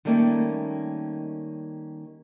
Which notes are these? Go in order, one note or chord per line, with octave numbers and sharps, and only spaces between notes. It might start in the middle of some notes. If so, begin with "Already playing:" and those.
D#3 G3 A3 A#3 C#4 D#4